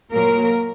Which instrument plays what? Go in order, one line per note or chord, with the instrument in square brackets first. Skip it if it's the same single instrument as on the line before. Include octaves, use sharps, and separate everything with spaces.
[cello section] A#2 F#3 A#3 A#4